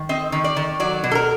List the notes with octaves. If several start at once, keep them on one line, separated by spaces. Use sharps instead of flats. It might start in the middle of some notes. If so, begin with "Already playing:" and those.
Already playing: D#3
C4 D#5
D#3
D5
D#3
F#3 D5
B2
A4
A#4